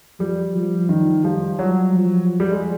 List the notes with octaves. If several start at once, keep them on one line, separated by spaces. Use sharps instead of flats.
F3 G3
F3
D#3
F3 G3
F#3
F3
G3
G#3